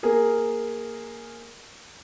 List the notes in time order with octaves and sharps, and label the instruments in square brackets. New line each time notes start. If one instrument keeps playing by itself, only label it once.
[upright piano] A#3 G#4 A#4